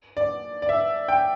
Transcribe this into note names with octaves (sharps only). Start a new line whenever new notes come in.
D5
D5
E5
G5